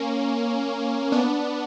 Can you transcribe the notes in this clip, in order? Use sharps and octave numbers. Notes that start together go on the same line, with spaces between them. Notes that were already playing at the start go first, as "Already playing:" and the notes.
Already playing: A#3 C#4
B3 D4